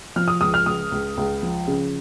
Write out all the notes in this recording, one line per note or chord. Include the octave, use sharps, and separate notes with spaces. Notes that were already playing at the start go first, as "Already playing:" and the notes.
F3 F6
D#6
C#2 D#6
F6
C#2 D#6
C#2
C#2
F3
C#3